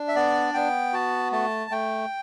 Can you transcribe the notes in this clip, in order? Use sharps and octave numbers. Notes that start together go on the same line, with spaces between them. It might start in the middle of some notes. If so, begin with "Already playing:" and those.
Already playing: D4
E5
B3 D5
B3 G5
F#4 A5
A3 A5
A3 G5